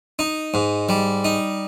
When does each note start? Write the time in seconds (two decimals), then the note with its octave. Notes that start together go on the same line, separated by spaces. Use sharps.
0.19 D#4
0.54 G#2
0.89 G3
1.24 D#4